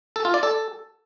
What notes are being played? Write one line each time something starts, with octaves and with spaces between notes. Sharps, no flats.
A4
F4
D5
A4